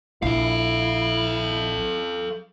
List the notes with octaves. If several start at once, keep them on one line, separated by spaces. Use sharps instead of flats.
A#1 E4 A4 F5